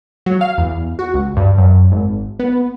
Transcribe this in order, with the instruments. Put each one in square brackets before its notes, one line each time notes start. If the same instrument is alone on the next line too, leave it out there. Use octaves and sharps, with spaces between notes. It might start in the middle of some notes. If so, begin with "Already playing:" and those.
[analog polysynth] F#3
F5
E2
F#4
C#2
G2
F#2
G#1
B3